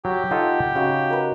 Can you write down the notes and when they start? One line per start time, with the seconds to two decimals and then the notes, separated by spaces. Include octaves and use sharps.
0.05 F#3 G4
0.31 D#4 F4 A4 F#5
0.75 C#3 D#4 F#4 F5
1.10 A#4 B4